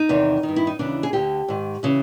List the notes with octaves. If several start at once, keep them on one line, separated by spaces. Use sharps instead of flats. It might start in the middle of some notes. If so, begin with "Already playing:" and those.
Already playing: D#4
E2 C3 D#3
D#3
G2
E4
D#4
D#2 C#3 E3 D4
G#4
D2 D3 G4
G#2 D#3
C#3 E3